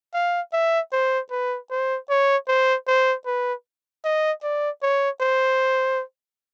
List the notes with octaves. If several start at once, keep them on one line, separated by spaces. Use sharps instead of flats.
F5
E5
C5
B4
C5
C#5
C5
C5
B4
D#5
D5
C#5
C5